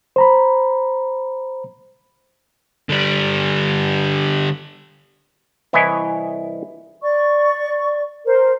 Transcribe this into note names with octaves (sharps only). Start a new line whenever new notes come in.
C5 A#5 B5
D3 G3
C2 E3 E4 C#5 D#5 G#5
D5 C#6
A#4 C5